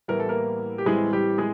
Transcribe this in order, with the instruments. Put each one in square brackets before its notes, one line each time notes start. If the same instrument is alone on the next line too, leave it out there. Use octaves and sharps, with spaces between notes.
[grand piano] A2 E3 G3 B3 A#4
A4
A#3 A#4
G4
A2 E3 G3 G#3 C4 G#4
G3 G4
G#3 G#4